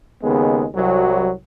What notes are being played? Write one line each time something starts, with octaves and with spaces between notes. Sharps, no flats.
D#2 C#3 G#3 B3
C2 F#3